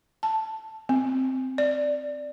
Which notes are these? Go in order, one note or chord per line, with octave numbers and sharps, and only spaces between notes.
A5
C4
D5